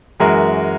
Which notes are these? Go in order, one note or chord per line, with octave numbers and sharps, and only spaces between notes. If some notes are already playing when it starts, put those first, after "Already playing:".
F#2 E3 G#3 F#4 A#4